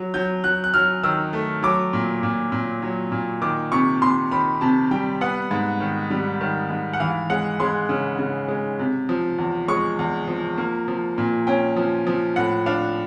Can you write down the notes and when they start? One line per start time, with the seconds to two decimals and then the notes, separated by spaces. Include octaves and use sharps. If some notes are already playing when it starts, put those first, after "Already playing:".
Already playing: F#3
0.14 F#3 G6
0.44 F#3 F#6
0.64 F#6
0.74 F#3 F6
1.03 D#3 E6
1.33 A3
1.63 F#3 D6
1.93 A#2
2.23 A#2
2.52 A#2
2.82 F#3
3.12 A#2
3.41 D#3 D6
3.72 C3 C#6
4.02 C3 C6
4.31 D#3 B5
4.61 C3 A5
4.91 G3 G5
5.21 B3 F#5
5.51 G#2
5.80 D#3
6.10 G3
6.41 D#3
6.70 G#2
6.93 F#5
7.00 E3 F5
7.30 G#3 F#5
7.60 G#3 C6
7.89 C#3
8.19 C#3
8.48 G#3
8.79 C3
9.09 F3
9.38 E2
9.68 G#3 C#6
9.99 E2
10.28 F3
10.58 A#3
10.88 F3
11.18 A#2
11.47 C#4 G5
11.76 F3
12.07 F3
12.36 A2 F#5
12.66 D4 F5